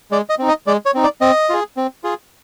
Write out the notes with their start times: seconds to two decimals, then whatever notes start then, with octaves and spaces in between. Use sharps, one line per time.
0.11 G#3 D5
0.29 D#5
0.39 C4 D#4
0.48 D#5
0.67 G#3 D5
0.86 C#5
0.94 C4 D#4
1.03 D5
1.21 C4 D#5
1.50 F4 G#4
1.77 C4
2.04 F4 G#4